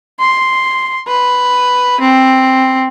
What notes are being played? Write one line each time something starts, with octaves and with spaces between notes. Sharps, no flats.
C6
B4
C4